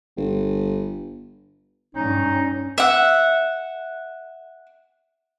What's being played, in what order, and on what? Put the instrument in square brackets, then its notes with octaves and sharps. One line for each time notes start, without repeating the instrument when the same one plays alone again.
[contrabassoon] G1
[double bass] G2 C#4 [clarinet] D#4
[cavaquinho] E5 F#5